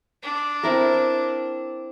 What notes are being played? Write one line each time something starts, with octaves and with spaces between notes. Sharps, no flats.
D4
C4 E4 A#4